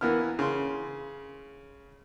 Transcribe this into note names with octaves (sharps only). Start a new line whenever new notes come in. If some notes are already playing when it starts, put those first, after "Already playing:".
E3 A#3 B3 E4 F6
C#3 C6